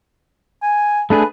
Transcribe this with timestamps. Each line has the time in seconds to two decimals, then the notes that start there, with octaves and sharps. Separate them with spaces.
0.62 G#5
1.10 A3 D4 G#4 B4